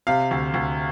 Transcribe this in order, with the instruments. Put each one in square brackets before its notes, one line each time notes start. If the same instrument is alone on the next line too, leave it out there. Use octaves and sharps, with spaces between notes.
[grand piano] C3 F5
D2
D2